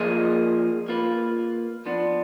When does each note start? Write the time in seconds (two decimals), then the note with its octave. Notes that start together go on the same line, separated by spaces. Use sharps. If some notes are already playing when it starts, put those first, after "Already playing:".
Already playing: F3 A#3 F4 G#4 D#5
0.88 A#3 F4 B4
1.86 F3 B3 D4